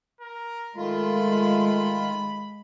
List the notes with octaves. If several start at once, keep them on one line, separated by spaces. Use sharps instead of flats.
A#4
D#3 G#3 A3 F4 B5